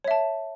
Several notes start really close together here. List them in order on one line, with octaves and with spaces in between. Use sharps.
C#5 E5 A5